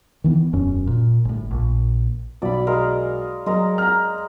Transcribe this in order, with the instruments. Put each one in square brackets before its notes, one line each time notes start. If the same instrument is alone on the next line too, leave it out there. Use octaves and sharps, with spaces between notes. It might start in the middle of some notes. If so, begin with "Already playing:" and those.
[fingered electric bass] D#3 E3 B3
E1 F#2 C#4
A#2
G1 A2
A#1
[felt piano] B1 [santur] D5 B5
[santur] G#3 A#4 F5
[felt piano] F#3 [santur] G#3 A#4
[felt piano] A#5 F6